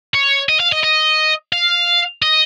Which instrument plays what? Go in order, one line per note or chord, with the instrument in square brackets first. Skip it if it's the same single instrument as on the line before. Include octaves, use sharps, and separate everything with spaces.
[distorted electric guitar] C#5
D#5
F5
D#5
D#5
F5
D#5